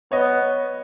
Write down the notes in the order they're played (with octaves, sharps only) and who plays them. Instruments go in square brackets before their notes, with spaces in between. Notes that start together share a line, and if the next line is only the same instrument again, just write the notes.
[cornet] B3 [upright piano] C#5 D#5